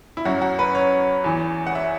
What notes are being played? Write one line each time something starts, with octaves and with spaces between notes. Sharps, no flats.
E4
F#2 F#3 F#4
F#4
B4
C#5
E2 E3
F#5
E5